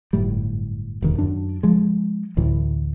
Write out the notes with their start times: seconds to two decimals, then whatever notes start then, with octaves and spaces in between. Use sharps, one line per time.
0.13 G1 F#2 A2 G3
1.02 E1 G2 D#3
1.18 F#2 D4
1.63 F3 G#3
2.37 A1 D2 A2 E3